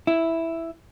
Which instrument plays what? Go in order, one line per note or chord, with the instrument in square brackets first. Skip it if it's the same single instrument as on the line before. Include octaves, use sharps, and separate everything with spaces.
[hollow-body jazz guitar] E4